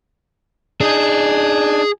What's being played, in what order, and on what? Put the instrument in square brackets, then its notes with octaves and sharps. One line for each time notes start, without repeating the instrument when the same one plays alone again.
[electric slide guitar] D4 D#4 [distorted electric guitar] G#4